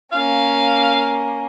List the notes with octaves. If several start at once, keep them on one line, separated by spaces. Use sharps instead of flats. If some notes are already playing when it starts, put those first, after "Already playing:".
A#3 C#4 F5